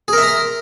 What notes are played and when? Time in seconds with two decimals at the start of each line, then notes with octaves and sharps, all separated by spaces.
0.08 G#4
0.13 A#4
0.18 E5
0.22 A#5
0.27 C6